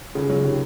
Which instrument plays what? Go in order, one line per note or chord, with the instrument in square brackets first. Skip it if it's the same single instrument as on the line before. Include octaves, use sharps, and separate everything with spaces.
[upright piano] C#2 [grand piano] C#3
[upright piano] F#3
[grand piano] C3 [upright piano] D#3